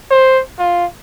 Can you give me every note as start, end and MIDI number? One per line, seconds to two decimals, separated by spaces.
0.11 0.41 72
0.59 0.85 65